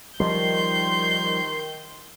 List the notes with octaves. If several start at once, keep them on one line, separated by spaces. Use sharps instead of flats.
D#3 F3 G3 C6 G6